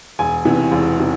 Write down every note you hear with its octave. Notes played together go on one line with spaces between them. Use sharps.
E1 G#5
E2 C3 E3
E1
C3 E3